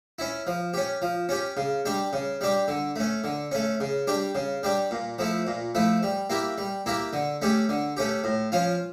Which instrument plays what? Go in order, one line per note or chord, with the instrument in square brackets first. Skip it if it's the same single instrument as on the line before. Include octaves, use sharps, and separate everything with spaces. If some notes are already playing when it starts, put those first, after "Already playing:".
[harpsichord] C#4 E4
F3
C#4 G4
F3
C#4 G4
C#3
G3 D4 G4
C#3
G3 D4 G4
D3
A3 C#4
D3
A3 C#4
C#3
G3 D4 G4
C#3
G3 D4 G4
A#2
F3 A3 E4
A#2
F3 A3 E4
G3
A#3 E4 G4
G3
A#3 E4 G4
D3
A3 C#4 G4
D3
A3 C#4 G4
A2
F3 C#4 F4